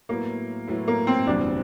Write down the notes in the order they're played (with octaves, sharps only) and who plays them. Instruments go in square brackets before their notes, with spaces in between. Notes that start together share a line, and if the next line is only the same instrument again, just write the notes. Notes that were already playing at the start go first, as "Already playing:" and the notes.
[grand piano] A2 F#3 B3 E4 [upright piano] A#3
[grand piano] A2 F#3 B3 E4
[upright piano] A#3
C4
[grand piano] F#1 E2 B2 G3 C4 [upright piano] D4